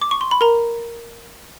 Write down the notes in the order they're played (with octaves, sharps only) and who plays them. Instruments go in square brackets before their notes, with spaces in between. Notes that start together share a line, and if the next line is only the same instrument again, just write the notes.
[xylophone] D6
C#6
C6
B5
A#4 A#5